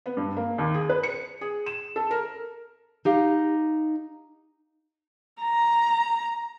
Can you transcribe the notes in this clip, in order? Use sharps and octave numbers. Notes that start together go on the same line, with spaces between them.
B3
G2
A#3
D#2
G#4
B4
C#7
G#4
E7
A4
A#4
D#4 G4 F5
A#5